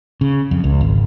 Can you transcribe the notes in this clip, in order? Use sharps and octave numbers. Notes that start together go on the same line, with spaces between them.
C#3
F2
C#2
G#1